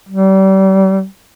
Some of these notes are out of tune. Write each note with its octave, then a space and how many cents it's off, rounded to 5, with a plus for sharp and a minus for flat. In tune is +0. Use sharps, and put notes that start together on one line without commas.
G3 -35